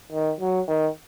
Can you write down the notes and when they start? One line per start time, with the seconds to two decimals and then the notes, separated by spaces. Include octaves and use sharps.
0.12 D#3
0.40 F#3
0.68 D#3